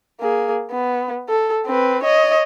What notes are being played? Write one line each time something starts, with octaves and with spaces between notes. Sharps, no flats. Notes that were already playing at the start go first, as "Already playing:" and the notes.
A#3 G#4
B3
A4
C4 B4
C#5 D#5